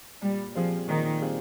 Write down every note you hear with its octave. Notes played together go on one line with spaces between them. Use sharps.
A#2 G3
F3 G3 C4 F4 G#4
A#2 D#3
G3 C4 F4 G#4